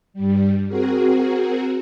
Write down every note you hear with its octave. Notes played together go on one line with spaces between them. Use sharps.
G2 G3
C4 F#4 G#4 A#4